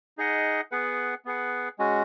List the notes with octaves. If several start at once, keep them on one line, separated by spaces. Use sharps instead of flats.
D#4 G#4 D#5 F#5
B3 G#4 B4 F#5
B3 G#4 B4 F#5
G#3 C#4 F#4